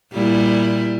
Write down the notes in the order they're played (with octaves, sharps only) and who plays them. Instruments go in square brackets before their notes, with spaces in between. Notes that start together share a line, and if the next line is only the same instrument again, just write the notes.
[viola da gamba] A#2 G3 E4